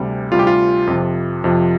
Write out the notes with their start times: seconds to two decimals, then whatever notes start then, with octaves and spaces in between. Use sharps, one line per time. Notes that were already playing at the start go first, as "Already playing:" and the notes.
Already playing: D2 C3 G3
0.32 D2 C3 G3 F4
0.39 G4
0.47 F4
0.87 F2 C3 F3
1.44 F2 C3 F3